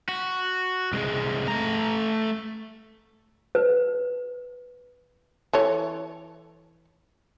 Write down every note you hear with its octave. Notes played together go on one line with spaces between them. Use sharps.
F#4
C2 G#3
A3 A#5
B4
E3 A4 C#5